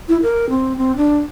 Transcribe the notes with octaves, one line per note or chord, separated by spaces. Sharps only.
E4
A#4
C4
C4
D4